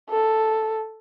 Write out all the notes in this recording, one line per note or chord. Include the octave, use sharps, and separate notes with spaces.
A4